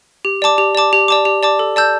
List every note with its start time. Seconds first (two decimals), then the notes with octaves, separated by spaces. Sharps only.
0.25 G4
0.42 D5 A5 D6
0.58 G4
0.75 D5 A5 D6
0.93 G4
1.08 D5 A5 D6
1.25 G4
1.43 D5 A5 D6
1.59 A4
1.76 D5 A5 E6 G6